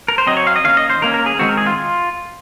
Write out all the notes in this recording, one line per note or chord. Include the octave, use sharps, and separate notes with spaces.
A#4
C5
F#3 C4 D#5
C#5
F5
D#5
D#3 A#3 C#4 F5
D#5
C5
D#3 A#3 C#4 A#4
A#4
G#4
D#3 G#3 C4 F#4
A#4
G#4
F4